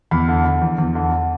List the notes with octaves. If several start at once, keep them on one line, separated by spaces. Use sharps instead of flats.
E2 B5
D3
D3
E2
E2
D3
D3